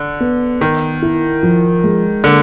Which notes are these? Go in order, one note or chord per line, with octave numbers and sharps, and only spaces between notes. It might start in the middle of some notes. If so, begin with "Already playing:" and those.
Already playing: D3
B3
D#3 B3
E4
F3
G#3
D3 A#3